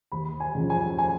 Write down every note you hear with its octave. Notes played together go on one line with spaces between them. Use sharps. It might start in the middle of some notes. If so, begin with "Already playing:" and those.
D#2 B5
G#5
C#3 F3
G#5
G#5